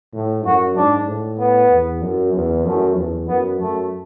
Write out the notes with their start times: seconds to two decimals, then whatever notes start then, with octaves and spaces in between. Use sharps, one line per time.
0.13 A2
0.45 F#2 F#4
0.76 G#2 D4
1.08 A2
1.39 B3
1.71 E2
2.02 F#2
2.34 E2
2.65 F#2 A3
2.96 E2
3.28 F#2 B3
3.59 F#2 A3